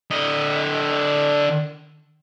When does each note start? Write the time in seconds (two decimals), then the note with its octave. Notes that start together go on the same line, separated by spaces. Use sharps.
0.10 D3 D#5